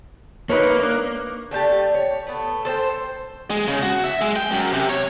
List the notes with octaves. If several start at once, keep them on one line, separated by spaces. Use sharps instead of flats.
A#3 D#4 B4 C#5
C#4 D4
A3 D4 G4 A5
C#5
A3 B3
A4 C5 F#5 G5
G#3
C#3
F#4
E5
G#3
G5
F#2
C3
C#5